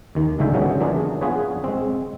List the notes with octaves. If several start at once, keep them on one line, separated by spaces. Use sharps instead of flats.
D#2 D#3
C#2 A2 D3 G#3 E5 G5
C#3 F#3 G3 B3 C#4
E3 A#3 D4 F4 G#4
B3 F4 G#4 B4 C#5
G#3 C4